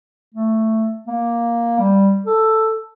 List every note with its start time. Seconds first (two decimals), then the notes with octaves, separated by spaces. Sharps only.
0.34 A3
1.07 A#3
1.79 G3
2.26 A4